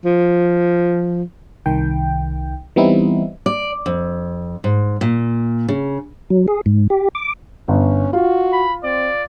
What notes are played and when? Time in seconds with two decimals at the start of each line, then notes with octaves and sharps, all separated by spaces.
0.05 F3
1.66 C2 D#3 G5
2.76 E3 G3 B3 C4 D#4 E4
3.46 D5
3.86 F2
4.64 G#2
5.01 A#2
5.68 C#3
6.30 F#3
6.48 G#4
6.66 G#2
6.90 G4
7.15 D6
7.68 G1 C#4
8.13 F4 F#4
8.53 B5
8.83 C4 D5